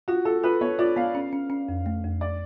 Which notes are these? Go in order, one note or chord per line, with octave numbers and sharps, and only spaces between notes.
F4 F#4
F4 A4
F4 B4
B3 C#5
F4 D5
B3 F5
C#4
C#4
C#4
F2
A3
F2
D5